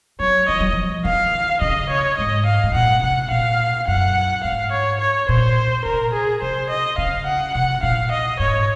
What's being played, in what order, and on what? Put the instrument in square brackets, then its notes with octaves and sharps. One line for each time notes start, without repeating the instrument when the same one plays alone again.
[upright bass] F#3 [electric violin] C#5
[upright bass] F3 [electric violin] D#5
[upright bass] F#3
F3
[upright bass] D#3 [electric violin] F5
[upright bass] C#3 [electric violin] D#5
[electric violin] C#5
[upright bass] G#2 [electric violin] D#5
[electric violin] F5
[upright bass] G#2
[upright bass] A#2 [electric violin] F#5
[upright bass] C3 [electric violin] F#5
[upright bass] A#2 [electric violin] F5
[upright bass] F#2 [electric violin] F#5
[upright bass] G#2 [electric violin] F5
[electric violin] C#5
C#5
[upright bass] A#2 [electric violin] C5
[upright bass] C3 [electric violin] A#4
[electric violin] G#4
[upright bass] C3 [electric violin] C5
[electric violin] D#5
[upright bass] C#3 [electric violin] F5
[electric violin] F#5
[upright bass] C3 [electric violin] F#5
[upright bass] A#2 [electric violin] F5
[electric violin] D#5
[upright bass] G#2 [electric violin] C#5